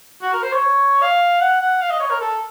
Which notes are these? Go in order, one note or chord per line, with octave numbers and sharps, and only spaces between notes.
F#4
A#4
C5
C#5
F5
F#5
F#5
F5
D#5
C#5
A#4
A4